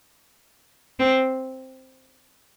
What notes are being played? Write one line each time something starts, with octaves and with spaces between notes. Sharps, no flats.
C4